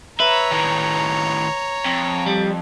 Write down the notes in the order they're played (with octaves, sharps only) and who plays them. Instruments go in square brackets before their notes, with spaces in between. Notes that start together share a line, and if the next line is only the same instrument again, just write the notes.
[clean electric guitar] B4 [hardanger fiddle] C#5 A#5 [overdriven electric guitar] E5
[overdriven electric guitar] A2 D#3
F2
[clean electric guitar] G3